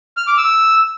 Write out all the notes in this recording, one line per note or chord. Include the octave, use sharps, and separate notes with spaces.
F6
D6
E6